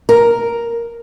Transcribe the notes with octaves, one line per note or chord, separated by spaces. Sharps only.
A#4